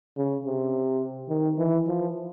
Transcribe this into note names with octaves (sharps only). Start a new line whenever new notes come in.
C#3
C3
D#3
E3
F3